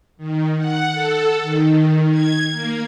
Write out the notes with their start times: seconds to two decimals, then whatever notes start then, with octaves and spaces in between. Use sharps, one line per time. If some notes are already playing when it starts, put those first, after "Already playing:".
0.17 D#3
0.57 F#5
0.92 A4
1.42 D#3
2.11 G#6
2.51 A#3